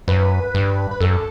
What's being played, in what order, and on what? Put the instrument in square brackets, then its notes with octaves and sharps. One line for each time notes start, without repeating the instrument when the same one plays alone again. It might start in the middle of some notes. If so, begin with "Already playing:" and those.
[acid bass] F#2 [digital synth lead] B4
[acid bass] G2
[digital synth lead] B4
[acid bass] F#2 [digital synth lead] A4